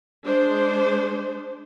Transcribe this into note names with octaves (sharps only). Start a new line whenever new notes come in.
G#3 D4 C5